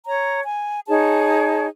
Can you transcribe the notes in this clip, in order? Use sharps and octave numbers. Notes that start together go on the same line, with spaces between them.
C#5 A#5
G#5
D#4 G#4 C#5 A5